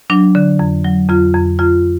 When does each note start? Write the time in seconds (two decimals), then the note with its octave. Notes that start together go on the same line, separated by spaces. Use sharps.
0.10 F#3 D4
0.35 D3
0.59 F2
0.85 F#3
1.09 F2 F4
1.34 F2
1.59 F2 F4